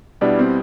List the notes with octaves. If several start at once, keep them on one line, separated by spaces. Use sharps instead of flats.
B2 G3 B3 D4 E4
C4